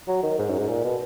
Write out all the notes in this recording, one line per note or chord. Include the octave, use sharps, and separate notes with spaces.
F#3
D#3
G#2
F#2
G#2
A#2
B2